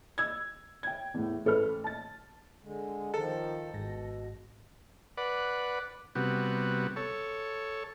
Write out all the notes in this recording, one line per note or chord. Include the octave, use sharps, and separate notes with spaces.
E6 G#6
G5 G#6
E2 A2
A1 A4 B4 F6
A5 A6
D3 G#3
D#3 F3 A4 A#5
G#1 G#2 B2 A#6
B4 D5 F#5
C3 G3 B3 F#4
A4 C#5